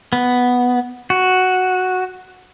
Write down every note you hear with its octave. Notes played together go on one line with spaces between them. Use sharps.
B3
F#4